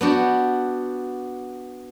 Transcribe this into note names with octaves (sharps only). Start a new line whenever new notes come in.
B3 D4 F#4 G4